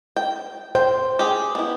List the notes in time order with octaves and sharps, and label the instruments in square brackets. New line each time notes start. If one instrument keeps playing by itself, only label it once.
[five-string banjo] G5
[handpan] C5 [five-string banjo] G5
[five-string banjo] G4 G#4
B3 E4